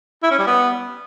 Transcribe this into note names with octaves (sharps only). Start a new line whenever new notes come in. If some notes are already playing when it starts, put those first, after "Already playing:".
E4
C#4
G3
B3